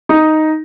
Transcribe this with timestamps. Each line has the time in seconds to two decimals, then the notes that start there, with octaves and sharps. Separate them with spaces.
0.09 D#4